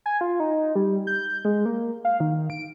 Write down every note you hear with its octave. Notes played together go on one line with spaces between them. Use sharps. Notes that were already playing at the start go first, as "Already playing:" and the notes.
G#5
F4
D#4
G3
G6
G#3
A#3
F5
D#3
D7